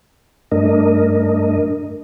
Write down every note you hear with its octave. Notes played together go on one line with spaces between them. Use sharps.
G2 A3 D4 A#4 D#5